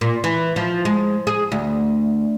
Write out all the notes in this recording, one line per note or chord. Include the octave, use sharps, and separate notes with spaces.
A#2
E3
F3
G#3
G#4
D2